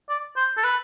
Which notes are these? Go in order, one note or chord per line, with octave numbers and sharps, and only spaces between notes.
D5
C5
A4
B4